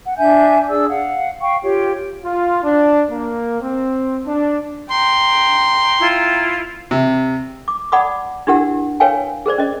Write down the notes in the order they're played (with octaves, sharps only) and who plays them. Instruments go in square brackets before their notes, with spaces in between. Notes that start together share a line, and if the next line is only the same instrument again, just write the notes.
[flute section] F#5
D4 E5 G#5 G6
D4 G#4 D5 E6
F5 F#5
F5 G5 C#6
F4 G4 C#5
[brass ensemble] F4
D4
A#3
C4
D4
[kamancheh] G5 A#5 [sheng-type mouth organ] C6
[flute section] E4 F4
[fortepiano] C3
[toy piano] D6
D5 F#5 A5 B5 D6 D#6
D4 E4 G4 A#4 F#5 E6
A#4 B4 C#5 F5 G5 G#5
G#4 A#4 C5 D5
C#4 D#5